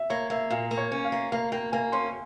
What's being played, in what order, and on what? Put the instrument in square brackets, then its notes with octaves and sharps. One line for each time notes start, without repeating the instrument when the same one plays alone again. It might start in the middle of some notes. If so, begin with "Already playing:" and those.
Already playing: [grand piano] E5
[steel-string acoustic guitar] A#3 [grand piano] C#5
[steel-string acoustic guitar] A#3 [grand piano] E5
[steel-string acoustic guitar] A#2 [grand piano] F5
[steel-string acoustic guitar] A#3
[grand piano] C#5
[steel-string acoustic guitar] C#4
[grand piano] F5
[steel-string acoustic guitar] A#3
[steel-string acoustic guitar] A#3 [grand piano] F5
[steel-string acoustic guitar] A#3 [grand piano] G5
[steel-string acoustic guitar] A#3 [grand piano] G#5
[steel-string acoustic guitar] C#4 [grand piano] C6